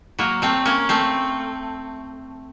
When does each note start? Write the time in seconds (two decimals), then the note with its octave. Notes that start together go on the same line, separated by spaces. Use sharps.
0.19 F#3 A#3
0.42 A3 C4
0.66 A#3 C#4
0.89 A3 C4